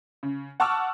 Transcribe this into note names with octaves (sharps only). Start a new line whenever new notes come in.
C#3
F#5 A5 C#6 D6 E6 F6